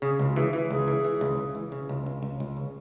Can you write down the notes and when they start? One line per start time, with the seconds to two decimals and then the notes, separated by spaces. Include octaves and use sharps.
0.02 C#3 G#4
0.19 C#2
0.31 F#4
0.36 E3 G#4
0.53 E3
0.71 C#2 G#4
0.88 E3
1.05 E3
1.21 C#2
1.38 C#2
1.55 E3
1.72 C#3
1.89 C#2
2.06 C#2
2.23 C#2
2.40 C#2
2.57 C#3